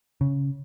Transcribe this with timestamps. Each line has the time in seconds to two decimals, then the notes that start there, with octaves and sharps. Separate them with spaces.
0.21 C#3